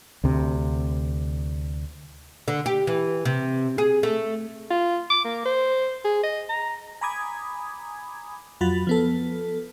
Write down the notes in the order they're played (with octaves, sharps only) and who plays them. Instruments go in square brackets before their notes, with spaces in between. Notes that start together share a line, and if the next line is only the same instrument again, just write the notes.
[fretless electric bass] D2 C3
[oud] D3
G4
E3
C3
G#4
A3
[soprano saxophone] F4
D6
A#3
C5
G#4
D#5
A#5
[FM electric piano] G#5 A#5 B5 D6 D#6 G#6
F2 F#3 F4 F#4 B5 A6
F3 B3 A4